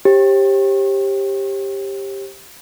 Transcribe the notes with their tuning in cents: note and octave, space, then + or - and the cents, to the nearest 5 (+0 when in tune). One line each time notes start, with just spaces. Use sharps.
G4 +5 C5 +45